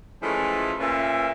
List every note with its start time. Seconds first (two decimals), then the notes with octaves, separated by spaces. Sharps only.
0.23 E3 F3 G#3 A3 C#4 F4
0.80 A#2 C#4 B4 E5